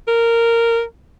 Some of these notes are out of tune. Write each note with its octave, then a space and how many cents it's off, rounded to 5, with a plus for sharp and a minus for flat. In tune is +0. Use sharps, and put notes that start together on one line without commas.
A#4 -10